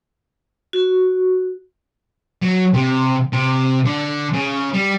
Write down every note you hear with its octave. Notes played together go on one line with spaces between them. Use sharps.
F#4
F#3
C3
C3
D3
C#3
G3